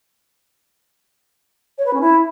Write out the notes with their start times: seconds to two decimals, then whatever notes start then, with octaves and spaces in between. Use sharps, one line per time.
1.78 C#5
1.86 B4
1.93 C#4
2.01 E4